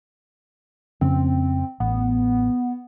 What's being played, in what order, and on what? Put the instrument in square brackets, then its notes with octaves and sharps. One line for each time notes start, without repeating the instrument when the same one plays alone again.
[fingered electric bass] F2 C#3 C#4 [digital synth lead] C4
[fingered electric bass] A1 [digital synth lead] B3